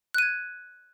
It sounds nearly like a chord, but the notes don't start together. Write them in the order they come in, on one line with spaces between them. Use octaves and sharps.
F#6 D#7 G#6